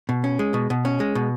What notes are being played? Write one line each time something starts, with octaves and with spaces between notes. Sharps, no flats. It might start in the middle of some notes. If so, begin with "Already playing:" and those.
B2
C#4
G#3
B2
B2
C#4
G#3
B2